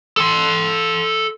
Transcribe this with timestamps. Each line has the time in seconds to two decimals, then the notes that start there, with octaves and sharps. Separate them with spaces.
0.17 A4 C6